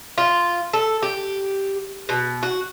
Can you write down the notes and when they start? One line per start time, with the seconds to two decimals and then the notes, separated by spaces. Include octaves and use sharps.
0.18 F4
0.73 A4
1.02 G4
2.09 B2
2.43 F#4